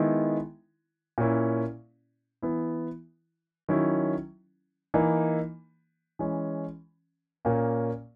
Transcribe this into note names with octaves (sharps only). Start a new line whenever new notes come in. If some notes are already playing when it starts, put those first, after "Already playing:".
Already playing: D#3 G#3 B3 E4
A#2 A#3 C#4 E4
E3 B3 E4
D#3 F#3 C#4 E4
E3 A#3 D#4
E3 G#3 C#4
A#2 A#3 C#4